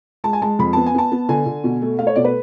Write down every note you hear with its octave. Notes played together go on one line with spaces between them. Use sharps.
G#3 A5
G#5
G#3 A5
F2 B5
B3 A5
G#5
B3 A5
B3
D3 G#5
D3
B2
A3
A3 F5
C#5
B2 D5
B4